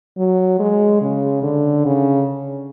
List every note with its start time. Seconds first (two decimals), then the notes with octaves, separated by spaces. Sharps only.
0.17 F#3
0.60 G#3
1.02 C#3
1.43 D3
1.86 C#3